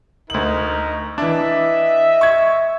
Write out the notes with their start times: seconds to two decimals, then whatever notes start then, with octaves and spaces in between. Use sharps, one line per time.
0.30 D2 D#4 A#4 D#5 F#7
1.18 E3 D4 D#5 E5
2.21 C#6 G#6